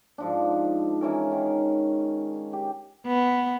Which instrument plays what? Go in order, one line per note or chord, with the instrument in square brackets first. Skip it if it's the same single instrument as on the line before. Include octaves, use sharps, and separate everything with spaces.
[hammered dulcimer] G#2 F3 D4
E3 C#4 A#4
D#3
G4
[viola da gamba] B3